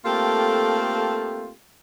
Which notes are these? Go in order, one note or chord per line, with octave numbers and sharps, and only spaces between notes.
A3 A#3 C4 F4 G4 A4